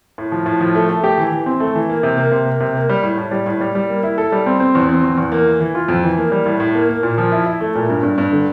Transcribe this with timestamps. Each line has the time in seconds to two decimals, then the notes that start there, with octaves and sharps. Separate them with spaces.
0.18 A2
0.32 F3
0.46 A2
0.61 F3
0.75 A3
0.89 A3
1.04 G4
1.18 E3
1.32 E3
1.46 C4
1.60 A3
1.75 E3
1.89 A#3
2.03 C3
2.17 A#3
2.32 C3
2.46 A#3
2.60 C3
2.75 A#3
2.89 G3
3.03 A2
3.18 A2
3.31 G3
3.46 A2
3.61 G3
3.75 G3
3.89 A#3
4.03 E4
4.18 A4
4.32 G3
4.46 C4
4.60 C4
4.75 E2
4.89 C4
5.04 E2
5.18 E2
5.32 A#3
5.46 E3
5.60 E3
5.75 F4
5.89 F2
6.04 E3
6.18 A#3
6.32 G3
6.46 A2
6.60 A2
6.75 A#3
6.89 A#3
7.03 A#2
7.18 F3
7.32 E4
7.46 E4
7.61 A3
7.75 A#2
7.89 G2
8.03 G2
8.18 G2
8.32 D3